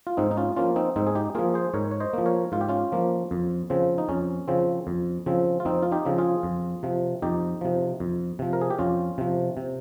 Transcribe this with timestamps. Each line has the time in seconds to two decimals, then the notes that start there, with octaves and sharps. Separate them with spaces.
0.07 F4
0.17 G#2 C4 D#4
0.31 D#4
0.37 C#4 F4
0.56 F3 A#3 C#4 F4
0.76 C4 D#4
0.96 G#2 C4 D#4
1.07 G#4
1.15 D#4 G4
1.35 F3 A#3 F4 G#4
1.54 G#4 C5
1.74 G#2 A#4 C#5
1.91 C#5
2.00 C5 D#5
2.13 F3 A#3
2.26 A#4 C#5
2.52 G#2 F4
2.61 G4
2.69 C#4 F4
2.92 F3 A#3
3.31 F2
3.70 C#3 F3 C4
3.98 D#4
4.09 F2 C#4
4.48 C#3 F3 C4
4.87 F2
5.26 C#3 F3 C4
5.60 F4
5.65 F2 C4 D#4
5.82 F4
5.92 D#4 G4
6.05 C#3 F3 C4
6.18 F4 G#4
6.43 F2
6.83 C3 F3
7.22 F2 D#4 G4
7.61 C3 F3
8.00 F2
8.39 C3 F3
8.53 A#4
8.61 G#4
8.70 G4
8.78 F2 C#4 F4
9.18 C3 F3
9.57 C3